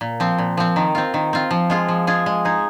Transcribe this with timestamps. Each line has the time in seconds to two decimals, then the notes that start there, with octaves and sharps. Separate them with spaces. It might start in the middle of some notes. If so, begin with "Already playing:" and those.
0.01 A#2
0.20 F3 C4
0.38 A#2
0.57 F3 C4
0.76 D#3
0.95 C4 F4
1.14 D#3
1.33 C4 F4
1.51 F3
1.70 G#3 F4 G#4
1.89 F3
2.07 G#3 F4 G#4
2.26 G#3
2.45 D#4 G#4